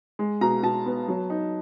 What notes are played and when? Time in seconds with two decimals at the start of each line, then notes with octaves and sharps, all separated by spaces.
0.19 G#3
0.41 B2 A#5
0.63 B2 A5
0.86 B3
1.08 F#3
1.30 D#4